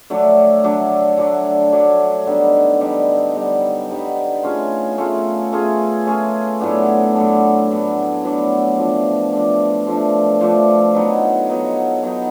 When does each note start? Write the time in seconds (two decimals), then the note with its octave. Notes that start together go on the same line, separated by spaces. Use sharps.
0.10 D3 F#3 A3 D4
0.64 D3 F#3 A3 D4
1.18 D3 F#3 A3 D4
1.72 D3 F#3 A3 D4
2.27 D3 G3 B3 D#4
2.81 D3 G3 B3 D#4
3.35 D3 G3 B3 D#4
3.89 D3 G3 B3 D#4
4.43 A3 C#4 F4 G#4
4.98 A3 C#4 F4 G#4
5.53 A3 C#4 F4 G#4
6.07 A3 C#4 F4 G#4
6.60 A2 F#3 B3 D4
7.15 A2 F#3 B3 D4
7.69 A2 F#3 B3 D4
8.24 A2 F#3 B3 D4
8.78 F3 A3 D4
9.33 F3 A3 D4
9.87 F3 A3 D4
10.41 F3 A3 D4
10.95 F#3 B3 D#4
11.50 F#3 B3 D#4
12.03 F#3 B3 D#4